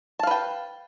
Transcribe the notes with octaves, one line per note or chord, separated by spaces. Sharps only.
B4 F5 G5 A5